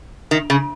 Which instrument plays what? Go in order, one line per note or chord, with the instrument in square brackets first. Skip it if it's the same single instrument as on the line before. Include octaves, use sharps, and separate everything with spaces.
[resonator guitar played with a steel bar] D#3
C#3